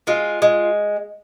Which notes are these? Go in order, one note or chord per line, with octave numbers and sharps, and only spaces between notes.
G#3 F4
G#3